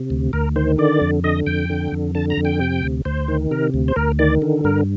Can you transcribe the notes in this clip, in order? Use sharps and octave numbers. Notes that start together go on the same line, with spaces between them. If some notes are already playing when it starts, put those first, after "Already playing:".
Already playing: C3
D2
D2 A#4
D#3 C5
D3 D5
F2
D3 D#5
F2 G5
D3
F2
D3 A5
A#5
F2
G5
C3
D2
D2 C5
D#3
C3 A#4
D2
C5
D2 A#4
D#3 D5
D3
G2 A#4